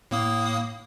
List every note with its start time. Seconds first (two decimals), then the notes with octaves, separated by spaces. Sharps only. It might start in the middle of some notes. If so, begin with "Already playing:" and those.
0.11 A2 A#3 D#6